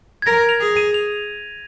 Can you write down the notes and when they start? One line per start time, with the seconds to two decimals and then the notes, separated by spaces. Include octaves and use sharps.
0.22 G#6
0.26 A#4 A#6
0.49 F7
0.61 G#4 F7
0.77 D#7
0.94 F7